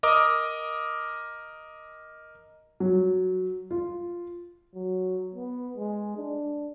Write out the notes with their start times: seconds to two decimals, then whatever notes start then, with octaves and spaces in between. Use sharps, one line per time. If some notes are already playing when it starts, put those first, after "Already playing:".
0.03 A#4 D#5 D6 D#6
2.80 F#3
3.71 F4
4.75 F#3
5.35 B3
5.77 G#3
6.17 D4